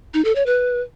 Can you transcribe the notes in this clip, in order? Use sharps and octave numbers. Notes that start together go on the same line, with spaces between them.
D#4
A4
C#5
B4